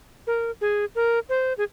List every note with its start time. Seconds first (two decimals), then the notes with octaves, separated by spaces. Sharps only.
0.27 A#4
0.61 G#4
0.95 A#4
1.29 C5
1.58 G#4